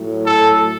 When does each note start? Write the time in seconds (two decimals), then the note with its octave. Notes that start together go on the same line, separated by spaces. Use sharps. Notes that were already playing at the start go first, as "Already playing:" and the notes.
Already playing: A2 F#3
0.26 A4